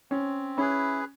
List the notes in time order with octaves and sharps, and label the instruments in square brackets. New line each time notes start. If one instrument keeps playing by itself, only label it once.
[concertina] C4 [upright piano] C#4
[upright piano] C#4 [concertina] E4 G#4 B4